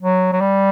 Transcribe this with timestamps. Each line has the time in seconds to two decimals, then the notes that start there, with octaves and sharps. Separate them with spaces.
0.01 F#3
0.33 F#3
0.41 G3